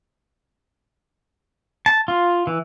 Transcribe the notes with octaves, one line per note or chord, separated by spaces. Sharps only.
A5
F4
E3